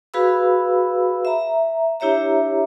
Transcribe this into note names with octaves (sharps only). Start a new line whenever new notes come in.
F#4 G#4 B4 F5 B5 E6
E5 A#5
D4 E4 G4 C#5 E5 A#5